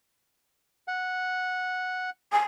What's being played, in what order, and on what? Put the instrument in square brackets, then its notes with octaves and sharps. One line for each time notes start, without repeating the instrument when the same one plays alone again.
[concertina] F#5
[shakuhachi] G#5